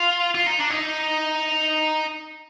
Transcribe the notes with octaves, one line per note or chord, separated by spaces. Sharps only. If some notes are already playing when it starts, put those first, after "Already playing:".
Already playing: F4
F4
D#4
D4
D#4